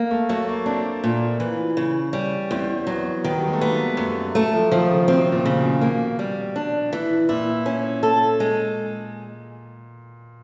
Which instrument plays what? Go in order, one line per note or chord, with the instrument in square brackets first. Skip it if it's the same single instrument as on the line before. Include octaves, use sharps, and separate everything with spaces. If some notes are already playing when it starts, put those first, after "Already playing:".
Already playing: [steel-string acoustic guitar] A#3
[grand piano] A3
[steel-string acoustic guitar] F#3 [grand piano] A3
[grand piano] A#3
[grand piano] C4 [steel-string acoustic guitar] D4
[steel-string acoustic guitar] A#2
E3
C#3
[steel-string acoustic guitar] G3 [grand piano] C#4
[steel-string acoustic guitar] E2 [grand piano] C4
[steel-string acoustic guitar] F#3 [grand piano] B3
[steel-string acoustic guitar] D#3 [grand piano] B3
[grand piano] F#3
G3
G#3
A3
[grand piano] A#3 [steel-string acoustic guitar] B3
[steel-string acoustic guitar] F#2 [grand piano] A3
[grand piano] F#3 [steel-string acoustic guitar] A3
[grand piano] F3
[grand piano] D#3 [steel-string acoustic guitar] F3
[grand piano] C#3
[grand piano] B2 [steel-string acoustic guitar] C4
[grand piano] A#2
[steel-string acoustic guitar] C#3
[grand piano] B2
[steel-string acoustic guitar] A#3
G3
D4
E3
[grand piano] A#2 [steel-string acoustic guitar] E4
[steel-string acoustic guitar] C#4
A4
G#3